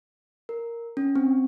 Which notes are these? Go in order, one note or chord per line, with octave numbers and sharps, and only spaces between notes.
A#4
C#4
C4